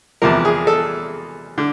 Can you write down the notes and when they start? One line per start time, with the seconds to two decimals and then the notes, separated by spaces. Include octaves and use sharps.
0.22 E2 C3 F3 A#4
0.45 G#4
0.67 A4
1.58 D3